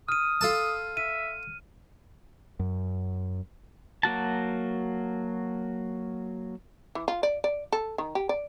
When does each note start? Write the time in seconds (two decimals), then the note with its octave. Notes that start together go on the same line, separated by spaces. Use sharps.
0.09 D#6 F6 D#7
0.41 F4 A4 A5
0.97 E5 D#7
2.59 F#2
4.03 F#3 A#3 F#4 A5
6.95 E3
7.08 F4
7.23 D5
7.44 D5
7.72 A4
7.98 D#3
8.15 G4
8.29 D5